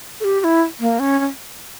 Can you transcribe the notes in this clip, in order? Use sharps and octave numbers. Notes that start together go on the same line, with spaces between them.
A4
G4
G4
E4
A#3
C#4
C#4